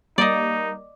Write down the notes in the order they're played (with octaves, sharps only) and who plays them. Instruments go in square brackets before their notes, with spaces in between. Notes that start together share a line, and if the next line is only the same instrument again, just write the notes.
[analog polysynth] G3 A#3 [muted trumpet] D#4 [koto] D5 D#5